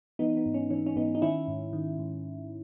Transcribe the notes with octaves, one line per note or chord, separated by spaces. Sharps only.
E3 B3 D#4
B3
G#2
C#4
E3 C#4
C#4
G#2 B3 D#4
D#4
D#3 C#4 E4
G#2
D#3
G#2